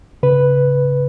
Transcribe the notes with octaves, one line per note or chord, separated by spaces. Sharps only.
C#3 B4